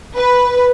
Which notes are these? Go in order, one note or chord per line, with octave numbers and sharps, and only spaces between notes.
B4